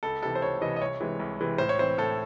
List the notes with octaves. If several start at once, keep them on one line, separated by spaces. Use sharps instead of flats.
C#2 A4
C3 E3 A4
C5
C#2 C#5
C3 E3 D#5
D#5
C2 C#5
C3 E3 G#3
C2
C3 E3 G#3
A2 C5
C#5
E3 C4 C5
A2 A4